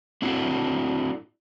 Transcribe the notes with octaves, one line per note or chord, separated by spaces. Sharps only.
C4 D4 E4 F#4